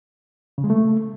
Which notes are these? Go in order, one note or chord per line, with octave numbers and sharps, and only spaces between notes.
C#3
G#3
A3